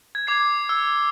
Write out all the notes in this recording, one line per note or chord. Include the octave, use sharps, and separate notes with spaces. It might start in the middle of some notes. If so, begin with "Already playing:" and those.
G#6
D6 G#6 C7
E6